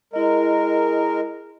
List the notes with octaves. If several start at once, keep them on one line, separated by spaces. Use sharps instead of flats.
G#3 E4 A#4 D#5